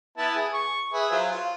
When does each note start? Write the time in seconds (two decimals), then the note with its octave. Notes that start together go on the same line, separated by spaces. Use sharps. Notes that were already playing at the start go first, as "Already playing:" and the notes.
0.18 B3 E4 A5
0.35 G#4
0.54 C#6
0.93 G#4 B4 E5
1.11 F#3 F4 C5
1.31 F4